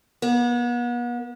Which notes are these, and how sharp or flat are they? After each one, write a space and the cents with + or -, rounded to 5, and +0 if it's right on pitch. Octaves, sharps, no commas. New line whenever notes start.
B3 -40